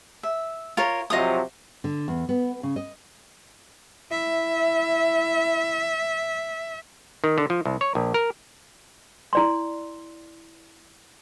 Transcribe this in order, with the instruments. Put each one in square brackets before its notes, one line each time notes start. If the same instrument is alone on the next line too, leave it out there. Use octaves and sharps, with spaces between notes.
[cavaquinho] E5
F4 A#4 C#5
[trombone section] C3 F3 F#3 [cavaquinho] D#5 F5 D#6
[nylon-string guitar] D3
E2
B3
C#3
D#5
[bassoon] E4 [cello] E5
[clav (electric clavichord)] D#3
D3
F3
C2
C#5
A#1
A#4
[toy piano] E4 D5 C6